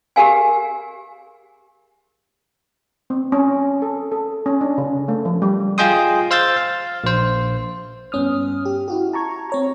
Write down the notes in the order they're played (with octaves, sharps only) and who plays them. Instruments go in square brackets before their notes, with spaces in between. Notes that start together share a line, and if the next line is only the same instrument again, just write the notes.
[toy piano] G4 G#4 A#4 F5 G#5
[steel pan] C4
C#4
A4
A4
C#4
D4
C#3
A3
F3
G3
[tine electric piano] F4 G#4 D#5 G5 C6 D#6
C5 F5 E6 G6 A6
F5
A#1 C5
[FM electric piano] G2 B3 C#4 D#6 F6
G4
E4 F#4 G4
A5 A#5 C#6 G#6
C4 C#5 A#5